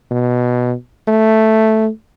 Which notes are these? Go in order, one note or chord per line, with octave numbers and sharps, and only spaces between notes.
B2
A3